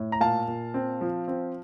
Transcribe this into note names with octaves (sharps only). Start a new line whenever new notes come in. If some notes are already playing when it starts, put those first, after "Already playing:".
Already playing: A2
A#5
A#2 F5 A5
A#2
C4
F3
C4